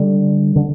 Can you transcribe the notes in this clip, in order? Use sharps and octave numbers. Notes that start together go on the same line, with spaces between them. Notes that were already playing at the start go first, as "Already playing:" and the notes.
Already playing: D3 G3
D3